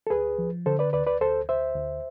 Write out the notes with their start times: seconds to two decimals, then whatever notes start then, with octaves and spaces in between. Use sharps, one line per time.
0.07 A4
0.10 D2 G#4 B4
0.38 F3
0.66 D3 A4 C5
0.79 B4 D5
0.93 D2 B4 D5
1.07 B4 D5
1.20 D2 A4 C5
1.49 D2 C5 E5
1.75 D2